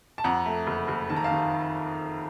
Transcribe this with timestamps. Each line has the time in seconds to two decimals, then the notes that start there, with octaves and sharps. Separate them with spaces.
0.18 A5
0.24 F2 F#5 A#5
0.46 A3
0.67 F#1
0.88 F#1
1.09 D#3 A5
1.16 A#5
1.24 F5 A5
1.31 D#3